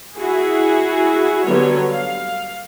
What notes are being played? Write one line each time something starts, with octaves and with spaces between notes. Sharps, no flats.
E4 F#4 G#4
D3 F#3 G3 B3 C#5
F5